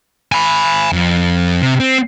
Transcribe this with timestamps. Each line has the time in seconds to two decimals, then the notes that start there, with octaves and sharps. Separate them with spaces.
0.32 G#5 B5
0.93 F2
1.62 C3
1.80 C4